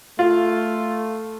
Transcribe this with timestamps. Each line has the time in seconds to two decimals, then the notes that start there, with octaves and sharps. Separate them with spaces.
0.19 A3 F4